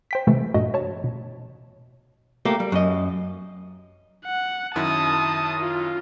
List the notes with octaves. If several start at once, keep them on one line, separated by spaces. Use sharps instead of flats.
C5 G5 B6
C3 E3 G#3 A3
G2 A#2 A3 F#4 D#5
C#5 A5
B2
A3 A#3 G4
G3
F#2 D#5
F#5
F#2 D#3 E4 A5 D#6
F4